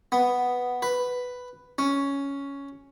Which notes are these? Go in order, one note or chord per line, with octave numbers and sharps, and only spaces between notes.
B3
B4
C#4